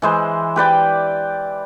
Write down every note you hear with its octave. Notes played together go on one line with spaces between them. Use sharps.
E3 G#3 C5
G4 B4 D5 G5